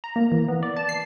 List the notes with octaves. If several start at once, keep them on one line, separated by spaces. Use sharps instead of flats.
A#5
A#3
E3
B3
D5
A5
C7